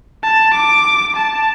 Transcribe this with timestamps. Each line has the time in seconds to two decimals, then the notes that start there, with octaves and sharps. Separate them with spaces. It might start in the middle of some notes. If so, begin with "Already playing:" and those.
0.23 A5
0.54 D6
1.16 A5